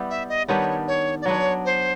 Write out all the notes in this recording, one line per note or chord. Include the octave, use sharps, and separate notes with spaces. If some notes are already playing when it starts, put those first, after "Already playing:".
Already playing: G3 B3 E4 G4
E5
D#5
D#3 G3 B3 D4 C#5
C#5
D5
F#3 B3 D4 C#5
C5